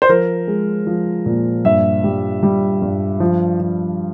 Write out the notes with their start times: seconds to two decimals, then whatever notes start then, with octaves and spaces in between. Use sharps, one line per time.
0.02 C5
0.09 F3 A#4
0.47 G#3
0.87 F3
1.26 A#2
1.65 G2 E5
2.04 G3
2.43 G3
2.82 G2
3.20 F3
3.60 F3